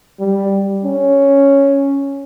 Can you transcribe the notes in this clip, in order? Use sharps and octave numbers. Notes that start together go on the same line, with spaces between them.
G3
C#4